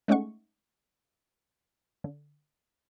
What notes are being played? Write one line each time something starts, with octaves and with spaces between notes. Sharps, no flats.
G#3 A3 C#4 D#4 F#5 C#6
D3